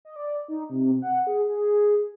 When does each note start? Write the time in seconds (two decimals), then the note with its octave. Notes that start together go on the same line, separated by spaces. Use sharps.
0.05 D#5
0.16 D5
0.48 D#4
0.70 C3
1.02 F#5
1.27 G#4
1.49 G#4